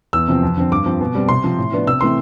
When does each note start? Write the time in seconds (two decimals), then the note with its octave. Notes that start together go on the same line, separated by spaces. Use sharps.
0.13 E2 E6
0.28 C3 F3 C4
0.43 F2
0.57 D3 F3 C4
0.72 G2 D6
0.86 F3 C4
1.01 B2
1.15 G3 C4
1.29 C3 C6
1.44 F3 C4
1.58 A2
1.72 F3 B3 D4
1.87 C3 E6
2.01 E3 A3 C4 C6